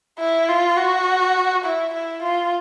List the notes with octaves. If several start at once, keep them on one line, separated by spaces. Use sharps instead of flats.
E4
F4
F#4
E4
E4
F4